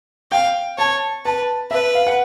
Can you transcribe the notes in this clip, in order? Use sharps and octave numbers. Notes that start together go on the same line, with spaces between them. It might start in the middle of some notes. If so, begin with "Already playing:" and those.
F5 G5
C#5 A5
B4 A5
B4 E5
F5
F#5